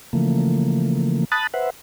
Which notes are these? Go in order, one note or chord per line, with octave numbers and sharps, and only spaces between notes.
C#3 E3 F3 A3 A#3
A5 B5 D#6 F#6 A6
B4 C5 E5 F#5